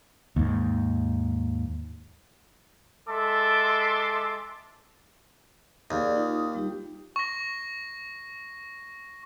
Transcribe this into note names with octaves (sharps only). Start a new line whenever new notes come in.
D#2 G#2
G#3 A4 E5 C6 D6
D#2 G#4 D5
D#4 F4 D#6
G3 D#4 G4
C#6 A#6